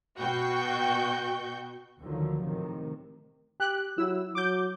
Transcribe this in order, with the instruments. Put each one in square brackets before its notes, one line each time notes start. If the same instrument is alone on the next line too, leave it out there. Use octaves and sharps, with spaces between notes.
[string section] B2 F#4 G5 C#6 G6
[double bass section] D2 D3 D#3 F3 F#3
A2 C3 D#3
[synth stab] G4 F#6
[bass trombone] F#3 [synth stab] E4 E6
[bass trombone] F#3 [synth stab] D6 G6